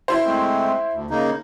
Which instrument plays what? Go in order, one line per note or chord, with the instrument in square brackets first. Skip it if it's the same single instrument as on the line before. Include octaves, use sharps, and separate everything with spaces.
[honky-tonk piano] E4 C5
[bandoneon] G#3 A3 C4
D2
C#3 A#3 D#4